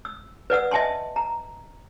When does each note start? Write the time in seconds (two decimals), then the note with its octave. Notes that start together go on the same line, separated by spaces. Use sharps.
0.05 E6
0.50 B4 D5 F#5 E6
0.71 D#5 E5 G#5 A5 C6
1.16 A#5